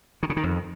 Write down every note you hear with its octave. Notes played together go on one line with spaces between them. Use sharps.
D#3
C#3
D#3
F2